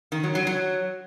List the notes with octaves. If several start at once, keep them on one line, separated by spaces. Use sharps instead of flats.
D#3
F#3
F#3
F#3